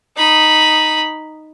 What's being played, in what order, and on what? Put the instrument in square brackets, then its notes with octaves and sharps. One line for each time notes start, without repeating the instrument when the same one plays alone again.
[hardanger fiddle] D#4 B5